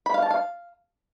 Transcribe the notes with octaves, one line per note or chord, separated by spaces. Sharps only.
B5
F5
A5
F5